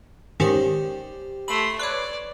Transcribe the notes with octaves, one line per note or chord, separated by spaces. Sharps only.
G#2 D#3 C#4 G4 C5 D5
A3 B5 C6
B4 C#5 D5